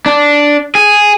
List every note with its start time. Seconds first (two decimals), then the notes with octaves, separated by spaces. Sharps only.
0.06 D4
0.75 G#4